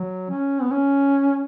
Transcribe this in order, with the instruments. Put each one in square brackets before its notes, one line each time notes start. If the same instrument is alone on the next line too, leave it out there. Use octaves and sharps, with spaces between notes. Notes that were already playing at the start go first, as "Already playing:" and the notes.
Already playing: [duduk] F#3
C#4
B3
C#4